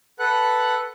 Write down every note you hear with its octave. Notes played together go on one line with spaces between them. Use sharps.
A4 B4 F#5 F#6